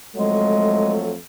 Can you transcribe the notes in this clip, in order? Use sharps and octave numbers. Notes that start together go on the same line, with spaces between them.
F2 F#3 G#3 A3